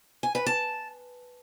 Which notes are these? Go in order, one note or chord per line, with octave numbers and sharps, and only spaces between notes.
G#5
B4
A5